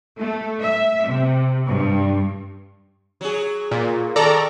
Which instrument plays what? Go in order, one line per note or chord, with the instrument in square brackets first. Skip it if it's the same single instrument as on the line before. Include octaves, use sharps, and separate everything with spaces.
[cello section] A3
E5
C3
G2
[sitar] F#3 G#4
[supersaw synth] A#2
[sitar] D#3 [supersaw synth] A4 D5 A#5